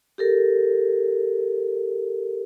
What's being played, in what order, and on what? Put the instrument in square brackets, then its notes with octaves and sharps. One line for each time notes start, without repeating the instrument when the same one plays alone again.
[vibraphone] G4 A4 A#4